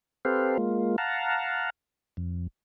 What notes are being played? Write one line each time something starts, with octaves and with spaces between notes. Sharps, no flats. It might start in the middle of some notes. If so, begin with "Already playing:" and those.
C4 G4 A4 B4 C5 F5
G#3 A#3 F4
F5 F#5 A5 A#5
F2